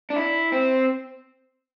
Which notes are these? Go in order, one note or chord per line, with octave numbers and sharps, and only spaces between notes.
D4
E4
C4